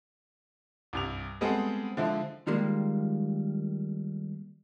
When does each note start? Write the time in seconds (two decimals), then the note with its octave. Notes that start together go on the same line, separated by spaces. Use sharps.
0.93 C2 G2 F7
1.41 G3 G#3 B3 C4 G#4 A4
1.97 D3 F3 G#3 E4
2.47 D#3 F3 G3 G#3 A#3